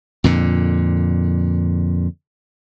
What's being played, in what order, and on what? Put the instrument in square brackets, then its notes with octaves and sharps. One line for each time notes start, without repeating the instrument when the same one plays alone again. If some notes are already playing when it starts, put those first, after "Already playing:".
[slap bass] F2 A#2 D3